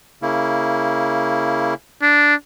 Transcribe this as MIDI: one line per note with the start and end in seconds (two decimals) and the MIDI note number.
0.22 1.74 49
0.22 1.74 58
0.22 1.74 64
2.02 2.34 62